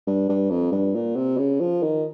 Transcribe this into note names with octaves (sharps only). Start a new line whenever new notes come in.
G2
G2
F2
G2
A#2
C3
C#3
F3
D#3